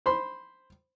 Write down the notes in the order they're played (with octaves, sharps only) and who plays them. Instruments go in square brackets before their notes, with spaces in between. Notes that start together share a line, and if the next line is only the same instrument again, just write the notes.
[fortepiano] C5 B5 C6